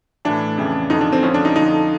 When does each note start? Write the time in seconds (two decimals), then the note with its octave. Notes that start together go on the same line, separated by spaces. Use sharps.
0.25 A2 E3 D4
0.58 F2 C#3 E3
0.90 F2 D3 F3 D#4
1.01 D4
1.13 C4
1.23 F2 D3 F3 C#4
1.34 D4
1.45 D#4
1.56 F2 D3 F3 D#4